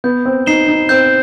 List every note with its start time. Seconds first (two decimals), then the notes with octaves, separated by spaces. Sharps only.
0.04 B3 G6
0.25 C4
0.46 D#4 C7 E7 G7
0.68 D#4
0.89 C4 G6